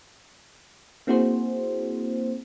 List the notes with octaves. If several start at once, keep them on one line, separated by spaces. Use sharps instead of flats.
A#3 C4 E4 F#4 G#4 C5